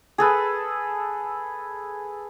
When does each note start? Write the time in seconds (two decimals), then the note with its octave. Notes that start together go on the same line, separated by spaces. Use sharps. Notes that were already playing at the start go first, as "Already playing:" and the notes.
0.18 G#4 A4 B4